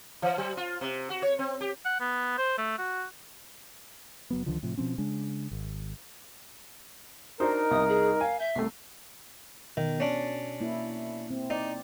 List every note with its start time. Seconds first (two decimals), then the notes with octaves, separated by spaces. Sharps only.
0.22 E3
0.38 F#3
0.57 F4
0.81 C3
1.10 F#4
1.22 C#5
1.39 C4
1.61 G4
1.85 F#5
2.00 B3
2.38 C5
2.58 A3
2.78 F#4
4.31 F#1 F#3 B3
4.46 C#2 D3 D#3 F3
4.63 A2 C3 F3
4.77 B2 F3 C4 C#4
4.98 C#3 G#3 D4
5.51 G#1
7.40 D4 D#4 F#4 A#4 C5
7.71 C2 D#5 D#6
7.89 G#4
8.21 F5 G#5
8.40 E5 G6
8.55 C2 A3 C7
9.77 B2 D#3
10.00 C#4 D4
10.61 A#3 E4
11.31 C4
11.50 D#4 D5